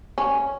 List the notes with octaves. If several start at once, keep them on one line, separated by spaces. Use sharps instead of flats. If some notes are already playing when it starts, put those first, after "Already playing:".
C#4